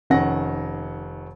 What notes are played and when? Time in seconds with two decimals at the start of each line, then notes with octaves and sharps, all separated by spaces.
0.10 F1 D#3 C#4 F#5 A#6